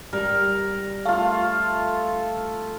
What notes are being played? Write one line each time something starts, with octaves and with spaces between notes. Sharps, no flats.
G3 A#4
A3 F4 F5